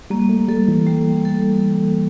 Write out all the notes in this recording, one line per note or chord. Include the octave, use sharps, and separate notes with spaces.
G3 A#3
A3
G3 A4
E3
G3
A4